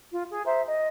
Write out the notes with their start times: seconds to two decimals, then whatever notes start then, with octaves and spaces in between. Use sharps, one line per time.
0.12 F4
0.29 G#4
0.45 C5 E5 A#5
0.66 D#5